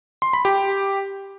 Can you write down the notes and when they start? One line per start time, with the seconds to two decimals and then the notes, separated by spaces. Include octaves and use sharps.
0.22 C6
0.33 B5
0.45 G4